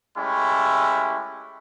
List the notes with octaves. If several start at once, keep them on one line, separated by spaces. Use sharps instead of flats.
G#3 A3 C#4 E4 G4